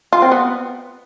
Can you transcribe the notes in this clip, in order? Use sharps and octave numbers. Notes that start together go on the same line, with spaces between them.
F4
C4
B3